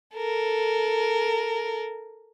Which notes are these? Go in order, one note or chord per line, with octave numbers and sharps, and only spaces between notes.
A4 A#4